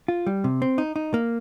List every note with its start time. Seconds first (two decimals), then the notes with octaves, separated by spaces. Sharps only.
0.08 F4
0.27 G3
0.44 C3
0.62 C4
0.78 D#4
0.96 D#4
1.14 A#3